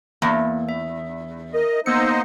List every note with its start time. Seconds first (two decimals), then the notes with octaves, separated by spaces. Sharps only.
0.22 E2 A#3
0.69 E5
1.54 A#4 D#5
1.86 A#3 B3 D#4 C5 D#5 E6 C#7